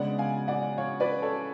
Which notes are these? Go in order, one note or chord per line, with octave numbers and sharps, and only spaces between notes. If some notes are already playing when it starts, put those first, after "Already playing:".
Already playing: C#3 G#3 B3 D4 D5 F#5
F5 G#5
D5 F#5
C#5 F5
B4 D5
A4 C#5